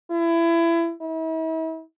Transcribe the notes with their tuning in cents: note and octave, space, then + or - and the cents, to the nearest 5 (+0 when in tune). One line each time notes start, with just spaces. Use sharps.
E4 +25
E4 -40